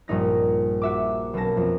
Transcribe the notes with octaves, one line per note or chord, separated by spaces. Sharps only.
A#1 G2 D#4 A#6
F#4 E5 D6
B1 A#3 C#4 A5 A#6
F2